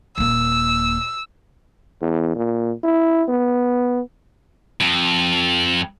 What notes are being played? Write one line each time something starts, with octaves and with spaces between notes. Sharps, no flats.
D#1 A#3 E6
E2
A#2
E4
B3
F2